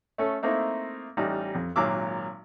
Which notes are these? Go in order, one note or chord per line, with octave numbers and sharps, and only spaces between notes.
A3 C#4 A4
A3 A#3 C4 D#4 E4
A1 G3 D#4
F2
G#1 A#2 F#3 F5 D6 E6